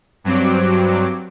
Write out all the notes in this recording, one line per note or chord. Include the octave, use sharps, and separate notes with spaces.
G2 F#3 C4 D6